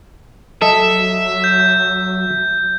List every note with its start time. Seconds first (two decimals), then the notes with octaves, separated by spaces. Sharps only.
0.62 F#3 A4 D#5 E5
1.44 G6